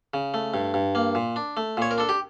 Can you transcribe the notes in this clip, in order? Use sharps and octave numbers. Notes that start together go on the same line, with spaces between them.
C#3
A3
G2
G2
A#3
A#2
D4
A3
A#2 C#5
A#4
D4 A4
G4